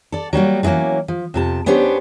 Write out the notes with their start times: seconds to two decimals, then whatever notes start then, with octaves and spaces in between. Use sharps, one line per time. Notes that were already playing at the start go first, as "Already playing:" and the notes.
0.12 A4 D5
0.33 F#3 G3 A#3 F#4
0.63 D3 E3 F#3 A#3 C#4
1.08 F3
1.34 F2 C3 A5
1.66 B3 C#4 D4 G4 C5